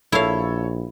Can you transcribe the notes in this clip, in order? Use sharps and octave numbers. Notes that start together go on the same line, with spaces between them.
A#1 E4 A4 C#5 F5